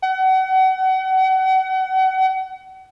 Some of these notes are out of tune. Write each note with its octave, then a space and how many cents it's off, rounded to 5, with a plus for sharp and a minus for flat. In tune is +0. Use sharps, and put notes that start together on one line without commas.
F#5 +35